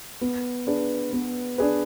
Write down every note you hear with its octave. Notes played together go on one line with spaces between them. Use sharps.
B3
D4 G#4 B4
B3
D4 G#4 B4